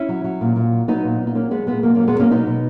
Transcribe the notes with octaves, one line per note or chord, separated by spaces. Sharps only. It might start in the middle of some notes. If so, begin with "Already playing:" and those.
Already playing: C#4 E4
F#3
F#3
A#2
A#2
F#3
F#3 B3 D#4
A#2
A#2
D#4
F#3 A#3 C#4
F#3 G#3 B3
A#2 G#3 B3
B2 F#3 A#3
A#3 C#4
F#3
G#3 B3
F#3 A#3 C#4
B2 B3 D#4
B2